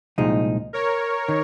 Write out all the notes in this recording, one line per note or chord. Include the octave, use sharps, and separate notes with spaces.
C2 A#2 F3 G#3 D#4
A#4 C#5
D#3